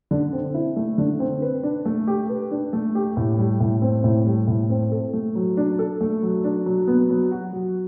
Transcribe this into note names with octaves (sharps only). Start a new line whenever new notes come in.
D3
C4
E4
A3
D3
C4
B4
D4
A3
G4
B4
D4
A3
G4
A2
G3
A2
C4
A2
G3
A2
C4
A4
A3
F#3
D4
A4
A3
F#3
D4
F#3
B3
F#3
F#4
F#3